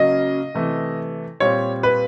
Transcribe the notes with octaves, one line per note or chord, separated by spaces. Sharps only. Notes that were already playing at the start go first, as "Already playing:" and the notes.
Already playing: C#3 F#3 A#3 C#4 D#5
C3 E3 A3
A#2 G3 C4 C#5
B4